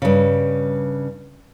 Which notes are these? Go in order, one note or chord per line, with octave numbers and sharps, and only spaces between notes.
G2 C#3